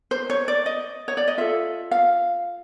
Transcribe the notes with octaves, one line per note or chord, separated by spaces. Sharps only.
C5
C#5
D5
D#5
C#5
D5
D#5
F4 A4 E5
F5